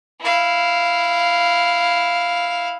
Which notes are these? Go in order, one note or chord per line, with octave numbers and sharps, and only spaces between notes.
E4 F5